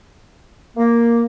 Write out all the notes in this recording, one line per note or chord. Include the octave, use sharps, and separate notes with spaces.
A#3